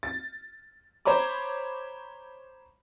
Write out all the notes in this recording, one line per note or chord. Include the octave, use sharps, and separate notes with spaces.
A6
C5 C#5 A#5 B5 D6